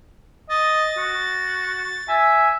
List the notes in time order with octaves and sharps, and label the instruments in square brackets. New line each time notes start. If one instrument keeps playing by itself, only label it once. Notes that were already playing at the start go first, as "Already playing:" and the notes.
[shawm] D#5 [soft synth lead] A6
[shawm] F#4
[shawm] E5 [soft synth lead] G#5